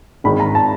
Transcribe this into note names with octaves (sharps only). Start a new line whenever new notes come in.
G#1 G#2 D#3 B5
A#5
A5